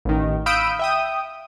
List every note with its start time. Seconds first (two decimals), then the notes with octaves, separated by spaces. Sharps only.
0.05 A1 D#3
0.46 F5 B5 D#6 E6 G6 D7
0.79 E5 G5 D#6